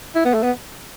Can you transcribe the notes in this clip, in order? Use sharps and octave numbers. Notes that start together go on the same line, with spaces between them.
E4
B3
A3
B3